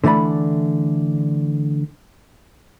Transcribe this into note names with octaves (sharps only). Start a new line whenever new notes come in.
D3 E3 A3 D5 B5